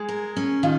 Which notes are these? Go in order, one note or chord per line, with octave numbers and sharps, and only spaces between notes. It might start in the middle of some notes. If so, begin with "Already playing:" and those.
Already playing: G#3 G#4
A#4
C#4
D#3 F4